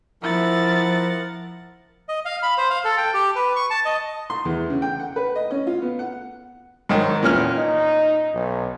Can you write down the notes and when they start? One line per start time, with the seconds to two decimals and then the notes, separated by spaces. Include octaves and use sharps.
0.23 F3 E4 A#4 F#5 A6
2.09 D#5
2.25 F5
2.43 B5
2.58 C5
2.70 F5
2.84 A4
2.98 G5
3.14 G4
3.36 B4
3.56 C#6
3.70 A5
3.85 D#5
4.30 C6
4.45 E2
4.70 C#3
4.82 G5
5.00 F#5
5.16 B4
5.36 D#5
5.51 C#4
5.67 F4
5.82 B3
5.99 F#5
6.89 G#2 D#3 F#3
7.23 E2 A#2 C#4 F6
7.57 D#4
8.35 B1